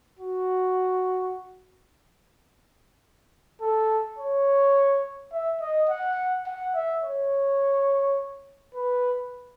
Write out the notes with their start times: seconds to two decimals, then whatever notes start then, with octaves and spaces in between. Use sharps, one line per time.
0.19 F#4
3.62 A4
4.18 C#5
5.32 E5
5.61 D#5
5.89 F#5
6.46 F#5
6.75 E5
7.04 C#5
8.75 B4